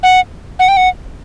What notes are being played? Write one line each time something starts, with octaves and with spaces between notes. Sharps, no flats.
F#5
F#5
G5
F#5